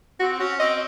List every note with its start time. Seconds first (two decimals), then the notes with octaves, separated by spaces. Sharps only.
0.20 C4 F#4
0.39 C#4 F#4
0.60 C4 D#5